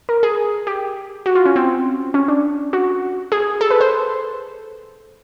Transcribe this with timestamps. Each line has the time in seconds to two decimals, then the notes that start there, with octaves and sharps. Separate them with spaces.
0.09 A#4
0.23 G#4
0.67 G4
1.26 F#4
1.35 F4
1.46 C#4
1.56 C4
2.14 C#4
2.28 D4
2.73 F#4
3.32 G#4
3.61 A4
3.71 B4
3.81 C5